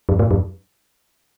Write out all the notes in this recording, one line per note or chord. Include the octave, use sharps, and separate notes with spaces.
F#2
A2
F#2